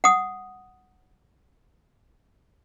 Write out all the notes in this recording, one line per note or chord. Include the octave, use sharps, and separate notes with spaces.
F#5 D#6